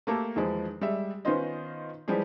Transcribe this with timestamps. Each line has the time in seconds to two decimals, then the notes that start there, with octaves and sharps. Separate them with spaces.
0.07 A3 A#3 G4 A4
0.36 E2 D#3 F3 G#3
0.81 G3 G#3 E5
1.25 D#3 B3 C#4 F4 C5 D#5
2.08 E3 F3 G3 G#3 G4 G#4